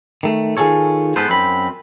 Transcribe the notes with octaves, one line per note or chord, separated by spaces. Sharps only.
D#3 A3
D#3 F4 G#4 A4 C#5
G#2 B3 A4 B4 C5
F#2 C4 B5